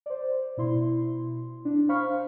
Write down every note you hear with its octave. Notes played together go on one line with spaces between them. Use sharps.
C5 D5
B2 E4 C6
D4
C5 F5 B5 C#6 F6